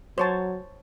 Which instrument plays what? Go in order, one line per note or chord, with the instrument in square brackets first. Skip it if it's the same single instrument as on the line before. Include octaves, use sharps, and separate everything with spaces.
[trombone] F#3 [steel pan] C5 C#5 A5